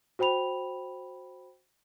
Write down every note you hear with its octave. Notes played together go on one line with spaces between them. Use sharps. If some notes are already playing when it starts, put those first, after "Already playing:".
F#4 C5 G5 B5 F7